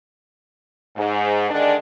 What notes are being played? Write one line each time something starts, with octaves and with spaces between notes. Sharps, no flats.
G#2
D3 D#3 G#3 D4